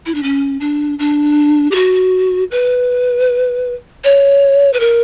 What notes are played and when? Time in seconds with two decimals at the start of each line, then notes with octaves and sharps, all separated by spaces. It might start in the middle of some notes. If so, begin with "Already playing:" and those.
0.06 E4
0.15 D4
0.23 C#4
0.60 D4
0.99 D4
1.71 G4
1.75 F#4
2.51 B4
4.04 C#5
4.73 B4
4.80 A#4